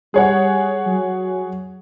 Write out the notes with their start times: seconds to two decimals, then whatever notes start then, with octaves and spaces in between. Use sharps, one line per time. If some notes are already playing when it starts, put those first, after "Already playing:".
0.14 G3 G#4 C#5 F#5
0.87 F#3